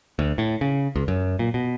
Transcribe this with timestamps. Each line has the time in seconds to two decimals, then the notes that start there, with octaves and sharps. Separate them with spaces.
0.19 D2
0.38 A2
0.61 C#3
0.96 C#2
1.08 F#2
1.39 A#2
1.54 B2